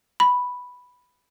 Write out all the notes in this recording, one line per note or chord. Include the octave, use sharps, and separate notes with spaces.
B5